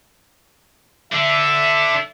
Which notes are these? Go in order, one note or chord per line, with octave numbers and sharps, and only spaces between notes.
D3 D4 A4 E5